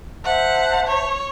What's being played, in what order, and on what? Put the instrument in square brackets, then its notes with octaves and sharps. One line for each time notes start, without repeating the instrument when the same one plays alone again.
[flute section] C5 E5 A5 [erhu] F#5
[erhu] C#5